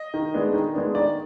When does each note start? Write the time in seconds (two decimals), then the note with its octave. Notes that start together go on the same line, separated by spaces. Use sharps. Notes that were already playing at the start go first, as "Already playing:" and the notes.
Already playing: D#5
0.14 D#3
0.34 G#3 B3 D4
0.54 D#3
0.74 G#3 B3 D4
0.94 D#3 D5